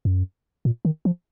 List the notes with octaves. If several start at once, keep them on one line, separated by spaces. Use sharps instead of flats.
F#2
A#2
D#3
F3